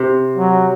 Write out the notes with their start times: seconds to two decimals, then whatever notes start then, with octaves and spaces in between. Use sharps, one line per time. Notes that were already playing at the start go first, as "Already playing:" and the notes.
Already playing: C3
0.37 F#3